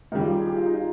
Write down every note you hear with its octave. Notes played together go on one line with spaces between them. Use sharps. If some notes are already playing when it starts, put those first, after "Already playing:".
D#2 C#3 G3 D#4
F4
G4
G#4
G4
F4
D#4
F4